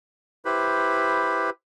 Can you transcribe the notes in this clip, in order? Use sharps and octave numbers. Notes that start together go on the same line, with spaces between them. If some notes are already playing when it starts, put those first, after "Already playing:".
E4 G4 B4 C5 B5